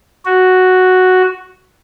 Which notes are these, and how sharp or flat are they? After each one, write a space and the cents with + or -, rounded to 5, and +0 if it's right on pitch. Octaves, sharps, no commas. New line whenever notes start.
F#4 +0